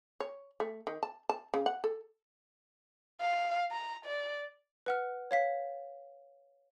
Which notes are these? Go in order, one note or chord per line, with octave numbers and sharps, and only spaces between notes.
C#5
A3
D#3
A5
A5
C#3
F#5
A4
F5
A#5
D5
B4 F#5 F6
C#5 F5 B6